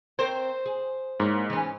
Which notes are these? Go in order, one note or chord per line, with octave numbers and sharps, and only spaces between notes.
C4 A#4 C5 C#5
G#4
G#2 A#3 E4 C#5
E3 B3 C#4